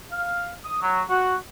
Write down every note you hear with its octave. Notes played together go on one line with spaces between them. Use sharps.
F5
D#6
F#3
F#4